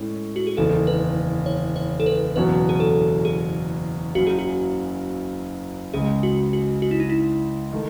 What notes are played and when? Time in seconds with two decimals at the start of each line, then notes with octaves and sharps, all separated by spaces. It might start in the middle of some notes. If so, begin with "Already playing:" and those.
Already playing: A2 G#3 C#4
0.36 F#4
0.47 G#4
0.57 F#1 E2 D#3 A4
0.87 B4
1.46 C#5
1.76 C#5
2.00 A4
2.06 B4
2.36 F#1 E2 B2 F#3 C#4 B4
2.69 G#4
2.80 A4
3.25 G#4
4.14 F#1 F#2 C#3 F#3 F#4
4.27 G#4
4.39 F#4
5.94 C#2 C#3 G#3 G#4
6.23 F#4
6.53 F#4
6.82 F#4
6.91 E4
7.00 D#4
7.09 E4
7.73 D#3 A3